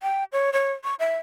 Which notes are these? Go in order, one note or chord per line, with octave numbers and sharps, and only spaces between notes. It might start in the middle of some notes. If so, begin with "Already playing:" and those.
G5
C#5
C#5
C#6
E5